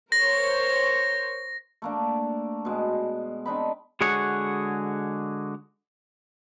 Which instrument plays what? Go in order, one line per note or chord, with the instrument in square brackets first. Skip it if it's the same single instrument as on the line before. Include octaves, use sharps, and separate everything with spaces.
[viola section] A#4 C5 C#5 [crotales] A#6
[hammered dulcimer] A3 A#3 D4
B2 G#3
C4 D4 D#4 B5
[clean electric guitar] D3 G#3 F#4 G#4 C#5 F#5